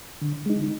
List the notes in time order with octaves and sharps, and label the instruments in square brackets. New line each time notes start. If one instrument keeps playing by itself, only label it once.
[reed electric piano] D3
G#3 D#4